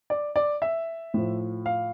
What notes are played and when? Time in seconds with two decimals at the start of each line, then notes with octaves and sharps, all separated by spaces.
0.10 D5
0.36 D5
0.62 E5
1.14 A2 F3
1.66 F5